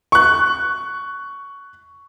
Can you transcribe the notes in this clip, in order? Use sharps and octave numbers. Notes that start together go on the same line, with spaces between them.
C#6 F#6